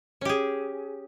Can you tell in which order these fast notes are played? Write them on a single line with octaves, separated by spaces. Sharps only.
C#4 G4 G#4